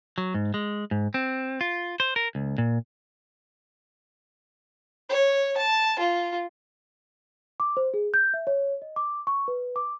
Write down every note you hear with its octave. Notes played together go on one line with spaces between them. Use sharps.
F#3
G#2
G#3
G#2
C4
F4
C5
A#4
C#2
A#2
C#5
A5
F4
D6
C5
G#4
G6
E5
C#5
D#5
D6
C#6
B4
D6